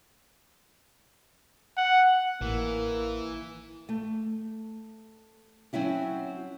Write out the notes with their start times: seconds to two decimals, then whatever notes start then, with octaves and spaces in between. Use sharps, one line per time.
1.77 F#5
2.41 A1 E3 A#3
3.89 A3
5.73 F#3 C4 C#4 E4 F#4